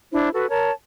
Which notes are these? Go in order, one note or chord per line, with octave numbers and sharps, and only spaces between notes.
D4 E4 C5
F#4 A4 B4
A#4 C#5 A5